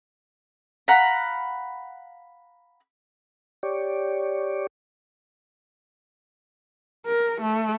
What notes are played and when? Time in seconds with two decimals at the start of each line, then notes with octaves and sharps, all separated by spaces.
0.88 F5 F#5 A#5 B5
3.63 G4 C#5 D5
7.06 A#4
7.41 A3